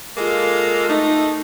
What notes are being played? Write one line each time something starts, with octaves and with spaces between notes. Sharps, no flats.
G#3 A#3 F4 A4
A3 D#4